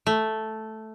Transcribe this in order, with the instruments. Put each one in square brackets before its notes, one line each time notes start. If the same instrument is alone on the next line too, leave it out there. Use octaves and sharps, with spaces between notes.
[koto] A3